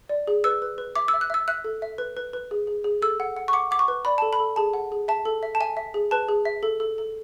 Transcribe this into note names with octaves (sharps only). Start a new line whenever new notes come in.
D5
G#4
B4 E6
B4
B4
E5 D6
E6
E5
F#6
E5 E6
E5 F#6
A4
E5
B4
B4
B4
G#4
G#4
G#4
A4 E6
F#5
F#5
C#6
F#5 D6
F#5 D6
C#6
B4
D5 B5
A4 A5
B5
A4
G#4 A5
F#5
G#4
E5 A5
A4
E5
A5
E5 G#5
E5
G#4
B4 A5
G#4
E5
A4
A4
A4